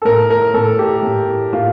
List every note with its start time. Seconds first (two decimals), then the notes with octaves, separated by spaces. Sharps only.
0.02 A4
0.05 A2 A#4
0.30 A#4
0.54 A2 A4
0.79 G4
1.03 A2
1.53 A2 F4